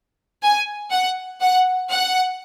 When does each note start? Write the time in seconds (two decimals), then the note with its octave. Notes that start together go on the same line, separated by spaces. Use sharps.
0.43 G#5
0.91 F#5
1.41 F#5
1.89 F#5